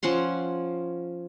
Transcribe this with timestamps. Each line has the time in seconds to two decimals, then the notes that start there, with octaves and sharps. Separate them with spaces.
0.03 F3 C#4 F#5 C6